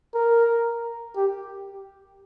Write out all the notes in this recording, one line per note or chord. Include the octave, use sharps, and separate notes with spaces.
A#4
G4